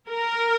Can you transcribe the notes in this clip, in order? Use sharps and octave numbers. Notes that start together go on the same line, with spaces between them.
A#4